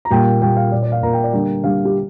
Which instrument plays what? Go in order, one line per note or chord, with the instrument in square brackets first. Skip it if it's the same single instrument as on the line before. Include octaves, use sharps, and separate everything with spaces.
[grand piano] A#5
A#2 G3 A#3 G5
A#2 G3 A#3 G5
F5
A#2 A#3 D5
D5
F5
A#2 A#3 A#5
G5
D5
D3 G3 A#3 G5
D3 G3 A#3 F5
G4